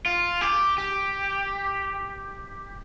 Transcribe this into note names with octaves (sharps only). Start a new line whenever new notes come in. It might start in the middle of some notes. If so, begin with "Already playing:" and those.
F4
G4
G4